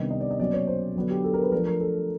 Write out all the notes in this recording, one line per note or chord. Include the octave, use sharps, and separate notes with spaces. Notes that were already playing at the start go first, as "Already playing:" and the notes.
Already playing: C3 D#3 G3 B3 D4 D#5
D#5
D5
D#5
B2 F#3 A#3 C#4 D5
C#5
C5
D3 F#3 B3 D4
G4
A4
A#4
B4
F3 A3 D4 A#4
A#4
A4